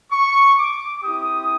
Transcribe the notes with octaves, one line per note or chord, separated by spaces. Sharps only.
C#6
D6
C4 E4 G4 D#6